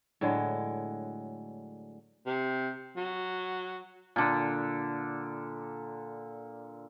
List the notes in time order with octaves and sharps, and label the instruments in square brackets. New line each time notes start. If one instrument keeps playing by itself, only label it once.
[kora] A2 D3 F#3 G#3
[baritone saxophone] C3
F#3
[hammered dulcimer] A#2 D3